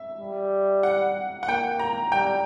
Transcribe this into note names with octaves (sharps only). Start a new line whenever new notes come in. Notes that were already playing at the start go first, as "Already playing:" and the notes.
Already playing: E5
G3
F#5
F#5
A#3 G5
A#5
G3 G5